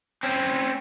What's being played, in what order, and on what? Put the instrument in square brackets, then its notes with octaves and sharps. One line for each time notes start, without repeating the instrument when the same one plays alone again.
[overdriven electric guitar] C4 C#4